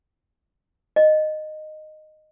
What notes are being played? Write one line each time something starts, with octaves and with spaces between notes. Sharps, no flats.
D#5